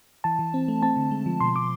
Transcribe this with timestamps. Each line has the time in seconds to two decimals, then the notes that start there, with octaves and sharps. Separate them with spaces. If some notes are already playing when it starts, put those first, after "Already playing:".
0.24 E3 A5
0.39 E3
0.54 C4
0.68 A3
0.82 C4 A5
0.97 D3
1.11 G#3
1.26 F3
1.40 B2 C6
1.55 B2 D6